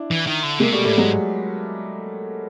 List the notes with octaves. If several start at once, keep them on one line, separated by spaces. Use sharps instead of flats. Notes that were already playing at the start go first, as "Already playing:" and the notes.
Already playing: D4 E4
E3
D#3
D3
C3 G#3 A#3
B2 G3 A3
A2 G3 A3
G#2 F#3 G#3